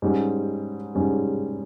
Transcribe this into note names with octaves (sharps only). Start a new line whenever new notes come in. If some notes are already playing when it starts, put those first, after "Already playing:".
G#2 G3 C#4
G#2 G3 C#4